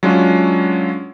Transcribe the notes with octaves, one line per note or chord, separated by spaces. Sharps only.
F#3 G#3 C#4 D4 F4